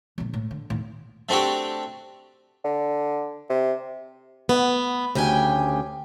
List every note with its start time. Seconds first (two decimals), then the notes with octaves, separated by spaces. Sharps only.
0.18 A#1 D3
0.34 A2
0.51 D3
0.70 D#2 A2
1.29 A3 C4 D4 F#4 G4
2.64 D3
3.49 C3
4.49 B3
5.15 D2 C#3 G4 G5 G#5